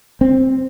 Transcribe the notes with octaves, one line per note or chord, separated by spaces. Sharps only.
C4